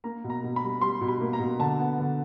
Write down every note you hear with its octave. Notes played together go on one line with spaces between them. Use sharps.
A#3 A#5
B2
A#5
B2
B5
G3
G3 C6
B2
B5
A#3
A#5
B2
D3 A5
B3
D3